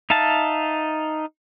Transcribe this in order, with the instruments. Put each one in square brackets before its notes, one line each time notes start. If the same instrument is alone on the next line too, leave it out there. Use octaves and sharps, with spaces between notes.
[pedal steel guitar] D#4 E5 F5 A5